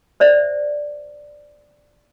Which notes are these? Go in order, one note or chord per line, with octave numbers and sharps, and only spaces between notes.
C5 D5 E5